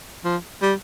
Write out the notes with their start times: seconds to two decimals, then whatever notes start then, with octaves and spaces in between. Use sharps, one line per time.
0.25 F3
0.62 G3